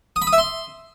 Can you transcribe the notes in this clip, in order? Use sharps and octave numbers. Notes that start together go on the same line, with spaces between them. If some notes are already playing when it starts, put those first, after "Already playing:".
D#6
B5
D#6
E5
C6